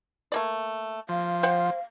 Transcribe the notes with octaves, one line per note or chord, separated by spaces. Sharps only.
A3 A#3 D5
F3 F5
C5 F#5 G5